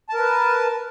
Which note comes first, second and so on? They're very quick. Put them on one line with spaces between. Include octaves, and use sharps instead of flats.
A5 A#4 B4